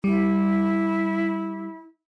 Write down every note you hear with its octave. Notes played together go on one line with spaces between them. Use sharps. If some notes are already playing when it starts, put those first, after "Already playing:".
G3 E4